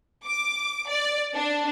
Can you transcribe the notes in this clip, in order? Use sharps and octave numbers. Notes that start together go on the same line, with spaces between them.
D6
D5
D4